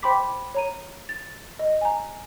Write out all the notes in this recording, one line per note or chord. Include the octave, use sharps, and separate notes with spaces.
C5 G5 B5 C6 D6 B6
C#5 A#5 D#7
A6
D#5
G#5 A#5